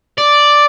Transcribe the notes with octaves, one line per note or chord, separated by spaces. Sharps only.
D5